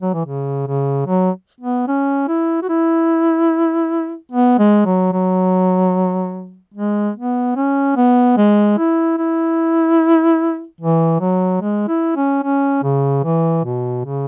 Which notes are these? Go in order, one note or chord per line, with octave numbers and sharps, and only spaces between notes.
F#3
E3
C#3
C#3
F#3
B3
C#4
E4
F#4
E4
B3
G#3
F#3
F#3
G#3
B3
C#4
B3
G#3
E4
E4
E3
F#3
G#3
E4
C#4
C#4
C#3
E3
B2
C#3